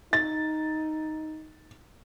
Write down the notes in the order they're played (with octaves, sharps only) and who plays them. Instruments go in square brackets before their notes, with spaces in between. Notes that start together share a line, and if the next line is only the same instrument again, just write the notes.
[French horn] D#4 [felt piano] A6